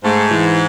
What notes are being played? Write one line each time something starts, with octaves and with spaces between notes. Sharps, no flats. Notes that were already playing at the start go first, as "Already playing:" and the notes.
G#2 A3
E3